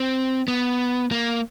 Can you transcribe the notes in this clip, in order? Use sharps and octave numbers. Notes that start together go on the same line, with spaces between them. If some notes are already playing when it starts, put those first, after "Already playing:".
Already playing: C4
B3
A#3